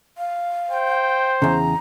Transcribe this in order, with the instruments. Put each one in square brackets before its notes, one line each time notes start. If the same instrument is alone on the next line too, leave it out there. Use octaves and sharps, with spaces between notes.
[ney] F5
[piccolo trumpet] C5 [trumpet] G5
[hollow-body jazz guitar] E2 C#3 [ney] A#5